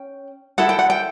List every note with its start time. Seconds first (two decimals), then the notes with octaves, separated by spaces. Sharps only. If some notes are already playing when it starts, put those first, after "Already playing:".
Already playing: C#4 G5
0.58 E4 A4 F#5
0.69 G5
0.79 F#5
0.90 G5